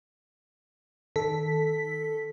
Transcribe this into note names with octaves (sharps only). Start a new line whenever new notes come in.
D#3 A4 B6